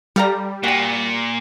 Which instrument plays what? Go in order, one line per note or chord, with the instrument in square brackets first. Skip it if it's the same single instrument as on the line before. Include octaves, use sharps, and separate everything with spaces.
[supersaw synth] G3 [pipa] A4 F5 A#5
[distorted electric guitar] A#2 [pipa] F#4 G4